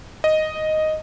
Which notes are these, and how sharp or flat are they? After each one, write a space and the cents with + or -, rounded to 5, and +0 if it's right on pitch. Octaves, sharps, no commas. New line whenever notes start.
D#5 +0